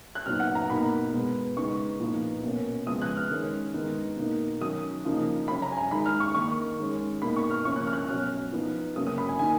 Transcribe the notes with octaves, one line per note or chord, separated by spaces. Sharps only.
F#6
A#2 F#3 B3 D#4 F6
F#5
A#5
B2 A#3 D#4 B5
B2 G#3 B3
C#3 G#3 B3 D#4 C#6
A#2 F3 B3 D#4
B2 A#3 C#4
C#3 F3 G#3 B3 D#6
F#6
F6
D#3 G#3 C#4
D#3 G#3 B3 D#4
B2 A#3 D#4
D#3 F#3 C#4 D#6
C#3 F3 A#3 D#4
C#3 F#3 C#4 B5
A#5
G#5
A#5
D#3 G#3 D#4 B5
F6
C#6
D#3 A#3 D#4 C#6
D#3 G#3 C#4
B2 A#3 D#4 B5
C#6
F6
C#3 F3 A#3 C#4 C#6
F#6
F6
F#6
F6
B2 F#3 C#4 F6
F3 B3 D#4
C#3 F#3 A#3 C#4 D#6
D#6
B5
G#5
D#3 A#3 D#4 G#5